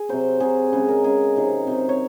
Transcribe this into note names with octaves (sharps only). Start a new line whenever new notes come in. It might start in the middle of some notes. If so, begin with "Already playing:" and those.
Already playing: G#4
C3 F#3 C5
C3 F#3 G#4
C#3 G#3
A#4
C#3 G#3 G#4
C3 D#3 F#3
C3 D#3 F#3
C#5